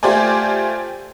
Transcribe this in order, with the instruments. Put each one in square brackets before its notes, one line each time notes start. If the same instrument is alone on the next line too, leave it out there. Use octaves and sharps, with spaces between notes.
[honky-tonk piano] A3 F4 G4 C5 D5 G#5